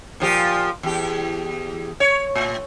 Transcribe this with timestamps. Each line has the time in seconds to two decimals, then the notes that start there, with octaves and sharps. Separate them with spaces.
0.20 A#2 F3 G4
0.83 E2 G4
2.00 C#5
2.35 A2